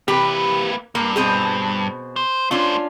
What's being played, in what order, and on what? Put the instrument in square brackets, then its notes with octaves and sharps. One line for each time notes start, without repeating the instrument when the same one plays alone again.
[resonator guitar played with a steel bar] C3 E3 G4 [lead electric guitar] A#3 B4
[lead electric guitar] G2 [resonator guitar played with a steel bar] A#3
[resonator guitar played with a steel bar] B2 C4 G#4
[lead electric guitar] C5
[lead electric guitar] A3 C5 [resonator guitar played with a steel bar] C#4 D4 F4